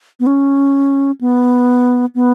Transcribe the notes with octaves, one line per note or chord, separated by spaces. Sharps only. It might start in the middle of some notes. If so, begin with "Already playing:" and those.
B3
C#4
B3
B3